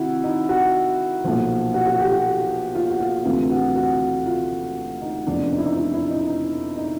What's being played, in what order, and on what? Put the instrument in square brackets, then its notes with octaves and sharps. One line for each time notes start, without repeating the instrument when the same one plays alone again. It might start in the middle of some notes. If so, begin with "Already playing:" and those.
Already playing: [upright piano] C3 D#3 E4 F#4
D#4
F#4
B1 A#2 F3
F#4
F#4
G4
F#4
F4
F#4
F4
D2 C3 E3 F4
F#4
F#4
F4
D#4
F1 E2 C#3 F3 D4
D#4
E4
D#4
E4
E4
D#4
D#4
D#4